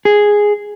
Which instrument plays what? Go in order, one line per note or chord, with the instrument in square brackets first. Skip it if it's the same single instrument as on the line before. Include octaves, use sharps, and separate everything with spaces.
[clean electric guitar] G#4